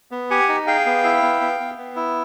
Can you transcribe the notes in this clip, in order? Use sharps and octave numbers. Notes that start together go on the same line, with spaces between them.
B3
G4 F#5 G#5
D#4
G#4 F5 G5
B3
E4
B3
B3
B3
B3
E4